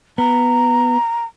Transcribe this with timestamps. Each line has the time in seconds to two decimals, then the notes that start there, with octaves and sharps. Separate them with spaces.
0.18 B3 A#5